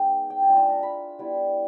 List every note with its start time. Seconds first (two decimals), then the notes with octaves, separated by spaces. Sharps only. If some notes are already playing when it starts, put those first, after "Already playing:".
Already playing: G#3 B3 D#4 G5
0.30 G5
0.42 G#5
0.48 A3 D4 F4
0.57 A5
0.70 A#5
0.83 B5
1.19 G3 B3 E4